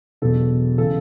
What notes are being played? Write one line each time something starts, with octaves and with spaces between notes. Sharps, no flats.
E1 E2 B2 F#3 A4
C#3 E3 A4